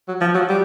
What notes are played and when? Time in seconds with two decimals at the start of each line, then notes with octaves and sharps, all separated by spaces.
0.08 F#3
0.21 F3
0.35 F#3
0.49 G3